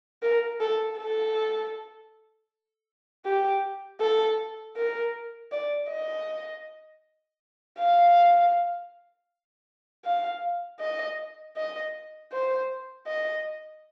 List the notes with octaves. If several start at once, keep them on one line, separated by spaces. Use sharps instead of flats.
A#4
A4
A4
G4
A4
A#4
D5
D#5
F5
F5
D#5
D#5
C5
D#5